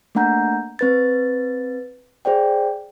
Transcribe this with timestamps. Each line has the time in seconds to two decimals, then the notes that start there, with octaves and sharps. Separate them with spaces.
0.15 A3 A#3 D4 F#5 A#5 G6
0.79 C4 B4 A6
2.25 G#4 C5 D5 G5